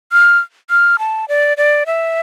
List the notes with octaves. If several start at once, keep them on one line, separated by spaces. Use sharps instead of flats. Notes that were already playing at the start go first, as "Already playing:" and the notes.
F6
F6
A5
D5
D5
E5